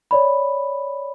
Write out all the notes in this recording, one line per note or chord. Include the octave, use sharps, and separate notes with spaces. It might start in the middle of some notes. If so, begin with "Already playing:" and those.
C#5 D5 B5